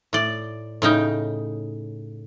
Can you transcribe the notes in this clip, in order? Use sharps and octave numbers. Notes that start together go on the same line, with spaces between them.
A2 D5
A2 C#3 D#4 G5